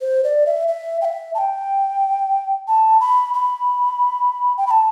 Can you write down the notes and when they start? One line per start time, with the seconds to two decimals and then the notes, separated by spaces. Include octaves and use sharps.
0.01 C5
0.24 D5
0.46 E5
0.68 E5
1.01 G5
1.05 E5
1.34 A5
1.38 G5
2.67 A5
3.00 B5
3.34 B5
4.57 G5
4.67 B5
4.71 A5